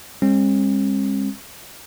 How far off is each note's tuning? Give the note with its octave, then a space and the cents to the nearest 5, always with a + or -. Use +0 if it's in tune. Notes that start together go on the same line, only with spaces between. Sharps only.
G#3 -45 C4 +45